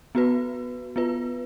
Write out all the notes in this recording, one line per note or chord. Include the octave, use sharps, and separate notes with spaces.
B3 F#4 B4
B3 F4 B4